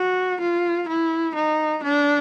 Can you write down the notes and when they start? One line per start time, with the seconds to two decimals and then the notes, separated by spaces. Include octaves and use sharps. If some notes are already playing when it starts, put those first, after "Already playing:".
Already playing: F#4
0.41 F4
0.89 E4
1.35 D#4
1.83 D4